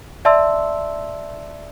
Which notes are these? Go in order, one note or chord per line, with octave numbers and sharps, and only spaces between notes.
D5 E5 A5 C6 E6